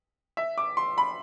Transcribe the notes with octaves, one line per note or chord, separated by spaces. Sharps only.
E5
D6
C6
B5